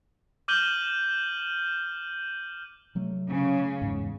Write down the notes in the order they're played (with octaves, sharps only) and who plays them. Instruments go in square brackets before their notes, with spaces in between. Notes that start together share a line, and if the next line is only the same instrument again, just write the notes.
[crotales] D6 F6 G6 D#7 F#7 G7
[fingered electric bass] C3 F#3 A3
[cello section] C#3
[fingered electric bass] E2 G#2